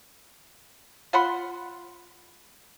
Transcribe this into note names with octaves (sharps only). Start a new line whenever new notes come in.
F4 F#5 B5 C6